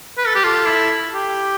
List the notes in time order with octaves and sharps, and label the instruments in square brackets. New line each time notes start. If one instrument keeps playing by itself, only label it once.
[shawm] B4
A4
G4
[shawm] F4 [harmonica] A4
[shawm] E4
[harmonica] G4